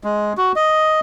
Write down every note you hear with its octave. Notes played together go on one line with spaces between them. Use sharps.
G#3
F#4
D#5